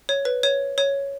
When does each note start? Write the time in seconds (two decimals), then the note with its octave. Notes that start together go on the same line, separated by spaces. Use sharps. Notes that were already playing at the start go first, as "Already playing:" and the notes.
0.09 C#5
0.25 B4
0.43 C#5
0.78 C#5